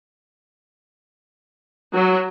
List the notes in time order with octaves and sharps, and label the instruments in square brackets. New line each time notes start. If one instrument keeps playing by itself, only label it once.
[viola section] F#3